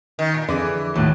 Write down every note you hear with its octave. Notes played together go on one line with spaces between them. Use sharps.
D#3
A#2
F2 D3 E3 G#4 D5
D#2 A2 F#3